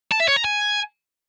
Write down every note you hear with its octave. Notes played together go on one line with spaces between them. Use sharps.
A5
E5
C#5
A#5
G#5